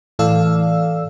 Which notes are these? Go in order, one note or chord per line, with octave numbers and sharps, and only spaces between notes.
A2 E3 A4 D5 F5 E6